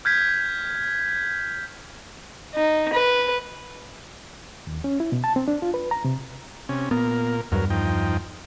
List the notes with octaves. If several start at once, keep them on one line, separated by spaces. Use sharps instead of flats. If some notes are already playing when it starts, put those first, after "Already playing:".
F6 G6 G#6 B6
D#4
B4
D#2
C#4
E4
B2
A5
C4
D4
F4
B4
A#5
C3
C3 C#4
A#2 B3 A#4
E2 G2 F#3 A#4
F3 D#4 G5